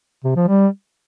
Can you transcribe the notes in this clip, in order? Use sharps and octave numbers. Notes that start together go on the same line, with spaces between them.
C3
F3
G3